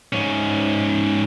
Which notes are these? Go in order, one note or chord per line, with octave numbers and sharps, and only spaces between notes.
G#2 C#4